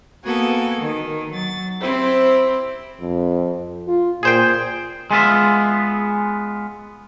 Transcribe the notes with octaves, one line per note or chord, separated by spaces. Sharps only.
A#3 B3 F#4 A4 G#5
D#3
F#3 A6
C4 E4 G4 C5
F2
F4
A#2 G#4 C5 G5
G#3 B3 F4 E5